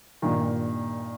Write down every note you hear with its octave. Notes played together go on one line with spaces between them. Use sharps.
G2 A#2 D#3